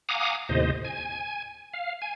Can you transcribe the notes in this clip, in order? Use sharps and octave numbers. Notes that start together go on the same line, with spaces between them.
F5 F#5 G#5 A#5 D6 D#6
D#2 A2 C3 C5 D#5
G#5
F5
G#5